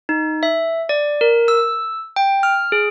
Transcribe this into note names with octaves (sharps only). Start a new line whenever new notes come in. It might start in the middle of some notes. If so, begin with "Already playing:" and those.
D#4
E5
D5
A#4
E6
G5
F6
G#4